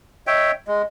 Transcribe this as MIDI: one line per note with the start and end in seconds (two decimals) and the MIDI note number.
0.27 0.51 73
0.27 0.52 75
0.27 0.51 76
0.27 0.51 79
0.68 0.82 56
0.68 0.85 75